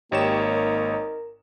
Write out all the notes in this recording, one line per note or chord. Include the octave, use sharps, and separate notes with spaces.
G#1 A#3 D#4 G4 C#5 E7
A#4